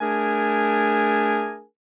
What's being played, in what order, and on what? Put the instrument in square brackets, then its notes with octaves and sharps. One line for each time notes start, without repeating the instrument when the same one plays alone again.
[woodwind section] A3 D4 G#4 A#4 G#5